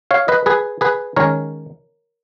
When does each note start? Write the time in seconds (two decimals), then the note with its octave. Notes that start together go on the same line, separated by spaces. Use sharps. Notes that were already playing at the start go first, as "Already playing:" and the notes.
0.11 C#5 F5
0.28 B4 D#5
0.46 G#4 B4
0.81 G#4 B4
1.16 D#3 G#3 C#4 A#4 C#5